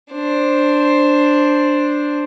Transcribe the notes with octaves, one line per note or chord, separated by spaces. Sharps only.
D4 C5